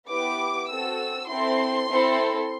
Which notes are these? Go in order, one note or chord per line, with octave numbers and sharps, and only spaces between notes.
B3 E4 G4 D6
C4 F#4 A4 E6
C4 E4 A4 C6
C4 E4 A4